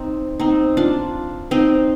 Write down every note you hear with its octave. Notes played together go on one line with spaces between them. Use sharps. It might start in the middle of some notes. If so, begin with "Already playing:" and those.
Already playing: C4 D#4
C4 D#4
D4 F4
C4 D#4